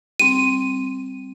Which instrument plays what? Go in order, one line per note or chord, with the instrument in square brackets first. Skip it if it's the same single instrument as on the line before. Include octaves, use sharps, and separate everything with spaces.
[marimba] G3 C4 [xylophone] D#7